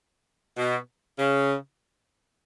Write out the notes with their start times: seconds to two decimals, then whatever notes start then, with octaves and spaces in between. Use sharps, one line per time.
0.57 B2
1.18 C#3